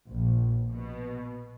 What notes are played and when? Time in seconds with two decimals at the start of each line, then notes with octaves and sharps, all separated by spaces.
0.11 A#1
0.73 B2